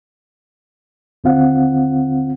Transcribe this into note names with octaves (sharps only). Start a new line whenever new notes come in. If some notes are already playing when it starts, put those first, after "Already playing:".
D#2 D3 C4 F4 F5 F#5